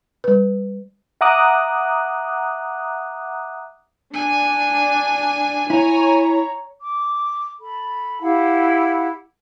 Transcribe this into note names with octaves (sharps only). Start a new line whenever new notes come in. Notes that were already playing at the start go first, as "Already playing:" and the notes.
G3 B4
E5 F#5 A#5 D6 D#6 F#6
D4 G#5
E4 C#5 A#5
D6
A4 B5
E4 G4 F5 F#5